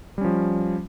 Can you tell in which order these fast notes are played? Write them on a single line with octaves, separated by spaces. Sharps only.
G3 C#4 F3